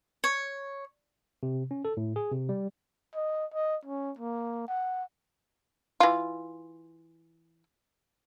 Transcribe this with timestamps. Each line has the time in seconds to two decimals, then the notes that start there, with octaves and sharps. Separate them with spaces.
0.24 C#5
1.43 C3
1.71 C#4
1.85 A4
1.97 A2
2.16 G#4
2.32 C3
2.49 G3
3.15 D#5
3.54 D#5
3.85 C#4
4.19 A#3
4.68 F#5
6.00 E3 F4